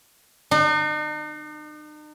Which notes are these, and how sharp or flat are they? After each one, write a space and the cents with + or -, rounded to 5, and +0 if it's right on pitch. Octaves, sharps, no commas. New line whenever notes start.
D#4 -45